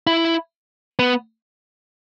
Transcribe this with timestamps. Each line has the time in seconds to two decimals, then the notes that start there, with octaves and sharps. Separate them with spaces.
0.07 E4
0.99 B3